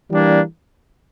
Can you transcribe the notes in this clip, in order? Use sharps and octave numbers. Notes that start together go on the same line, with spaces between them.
E3 G3 A#3 D4